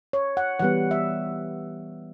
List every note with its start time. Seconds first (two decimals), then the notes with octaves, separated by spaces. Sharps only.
0.13 C#5
0.37 F#5
0.59 E3 G3 B3 F#5
0.91 E5